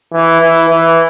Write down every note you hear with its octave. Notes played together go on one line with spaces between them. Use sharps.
E3
E3
E3